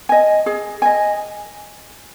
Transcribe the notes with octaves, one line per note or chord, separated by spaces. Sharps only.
D#5 G#5
G#4
D#5 G#5